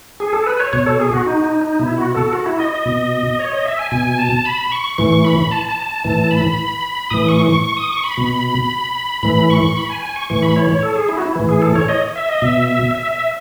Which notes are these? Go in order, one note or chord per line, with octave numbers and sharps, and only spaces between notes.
G#4
A4
B4
C#5
B2 C#5
A4
G#4
F#4
D#4
D#4
D#4
B2 E4
F#4
A4
F#4
E4
D#5
D#5
B2
C#5
D#5
E5
G#5
B2 G#5
A5
B5
C#6
A2 E3 C#6
B5
A5
A5
A5
A2 E3 A5
B5
A2 E3 D#6
C#6
C#6
C#6
D#6
C#6
B5
B2
A2 E3 B5
C#6
B5
G#5
G#5
C#6
A2 E3 C#6
B5
C#5
C#5
A4
G#4
E4
F#4
E4
A2 E3
G#4
A4
C#5
D#5
E5
D#5
B2 E5
E5
E5
E5